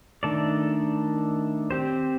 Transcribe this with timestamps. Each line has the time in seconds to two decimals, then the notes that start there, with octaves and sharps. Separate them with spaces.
0.23 D#3 A3 D4 A4 D5
1.71 C4 G4 C5